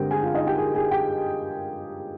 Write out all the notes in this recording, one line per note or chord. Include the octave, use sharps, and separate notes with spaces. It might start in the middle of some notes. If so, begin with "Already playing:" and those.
Already playing: G2 D3 G#3 C4 G4 A#4 G5
G#4 G#5
F4 F5
D#4 D#5
G4 G5
G#4 G#5
G#4 G#5
G4 G5